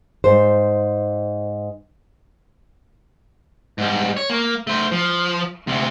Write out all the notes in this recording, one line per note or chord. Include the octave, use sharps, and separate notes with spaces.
G#2 C5
G#2 G3
C#5
A#3
A3 C5
F3
D2 C3